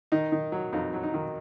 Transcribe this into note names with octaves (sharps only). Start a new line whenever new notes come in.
D#3 D#4
D#3
F#3
F2 D#4
F#3
D#4
D#3